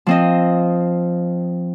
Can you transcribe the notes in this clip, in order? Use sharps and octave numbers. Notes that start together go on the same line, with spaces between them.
F3 C4 D#5